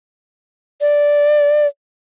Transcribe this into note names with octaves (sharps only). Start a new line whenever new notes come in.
D5